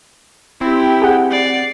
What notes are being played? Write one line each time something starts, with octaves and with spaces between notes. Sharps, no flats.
C4 E4 G4
G#4 F#5
D5 C7